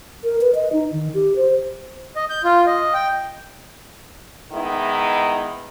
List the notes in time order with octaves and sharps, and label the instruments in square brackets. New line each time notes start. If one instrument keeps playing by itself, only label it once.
[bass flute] A#4
B4
D#5
D#4
D#3
G4
C5
[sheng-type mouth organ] D#5
G6
F4
D#5
G5
[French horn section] D#3 G#3 B3 D#4 E4